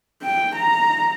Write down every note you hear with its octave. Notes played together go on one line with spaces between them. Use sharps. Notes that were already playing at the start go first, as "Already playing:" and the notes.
G5
A#5